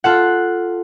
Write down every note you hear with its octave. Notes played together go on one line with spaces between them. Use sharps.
F4 A4 F#5